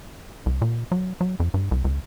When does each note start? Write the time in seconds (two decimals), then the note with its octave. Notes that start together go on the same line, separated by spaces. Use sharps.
0.46 C2
0.62 A#2
0.92 F#3
1.21 F#3
1.40 F2
1.54 G2
1.71 C2
1.84 C#2